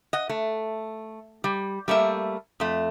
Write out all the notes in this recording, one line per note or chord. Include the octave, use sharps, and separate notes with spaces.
D#5 F#5
A3
G3
G3 A3 A#3 E5
F2 A3